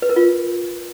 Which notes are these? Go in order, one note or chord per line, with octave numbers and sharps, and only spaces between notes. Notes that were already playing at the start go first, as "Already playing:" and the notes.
B4
A#4
F4